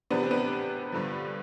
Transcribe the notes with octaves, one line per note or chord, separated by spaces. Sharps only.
E2 C3 F3 B3 D4
C4
B3 D4
G2 D3 F3